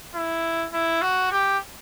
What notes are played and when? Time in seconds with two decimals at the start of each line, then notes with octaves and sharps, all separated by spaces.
0.15 E4
0.73 E4
1.02 F#4
1.32 G4